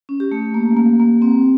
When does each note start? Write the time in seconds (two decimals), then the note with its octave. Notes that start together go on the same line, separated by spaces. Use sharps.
0.09 C#4
0.20 G4
0.32 A3
0.54 A#3
0.77 A#3
1.00 A#3
1.22 C4